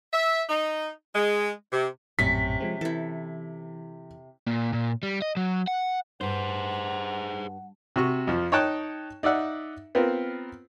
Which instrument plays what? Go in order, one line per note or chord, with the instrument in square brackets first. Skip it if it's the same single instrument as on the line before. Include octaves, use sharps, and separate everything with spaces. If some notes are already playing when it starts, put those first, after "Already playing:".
[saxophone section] E5
D#4
G#3
C3
[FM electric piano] A#1 F#2 A2 [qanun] C3 C#4 [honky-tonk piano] B6
[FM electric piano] F3 G#3 C4
[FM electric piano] E3 [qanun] E4 A4
[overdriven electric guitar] A#2
A#2
G3
D#5
F#3
F#5
[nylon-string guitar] G2 [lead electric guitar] G#4 C5 [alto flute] F#5
[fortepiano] C3 F#4 C#6
F2 F3
D#4 C#5 G5 A5 F#6
D#4 D5 E5 F#5
B3 C4 F4 A#4